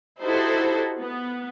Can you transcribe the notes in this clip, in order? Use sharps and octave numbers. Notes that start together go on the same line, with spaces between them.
D#4 E4 F#4 G4 A4 C5
B3